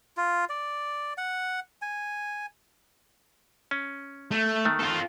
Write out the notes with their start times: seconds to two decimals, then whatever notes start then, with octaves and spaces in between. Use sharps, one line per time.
0.17 F4
0.49 D5
1.18 F#5
1.82 G#5
3.71 C#4
4.31 A3
4.65 D#3 A3
4.79 F4 A4